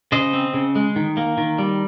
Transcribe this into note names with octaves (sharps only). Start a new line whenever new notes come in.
C#3 C5 D#5
C4
C#3
G#3
D#3
A#3
D#3
G3